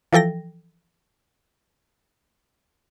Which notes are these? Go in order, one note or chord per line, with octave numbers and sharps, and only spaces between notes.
E3 F3 A4 G5 A#6